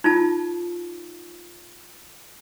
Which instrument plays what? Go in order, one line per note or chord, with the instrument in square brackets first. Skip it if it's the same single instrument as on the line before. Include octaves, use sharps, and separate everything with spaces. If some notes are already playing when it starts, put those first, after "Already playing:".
[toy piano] D#4 F4 A5